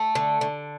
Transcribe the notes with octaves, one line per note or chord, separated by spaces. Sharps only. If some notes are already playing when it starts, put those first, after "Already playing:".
Already playing: A3
D3
D3